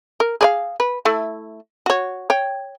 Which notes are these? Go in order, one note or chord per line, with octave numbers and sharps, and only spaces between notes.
A#4
G#4 D5 F5
B4
A3 E4
F#4 C#5
C#5 G5